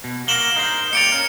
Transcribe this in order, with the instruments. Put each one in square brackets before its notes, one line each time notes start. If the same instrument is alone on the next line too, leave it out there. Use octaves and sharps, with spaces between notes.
[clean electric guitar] B2
[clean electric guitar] A#3 F#4 A#4 [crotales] E7 F#7 G7
[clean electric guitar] D#4 A#4 C5
[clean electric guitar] A#3 G4 D5 [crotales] C#7 D7 F7
[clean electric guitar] C#4 A#4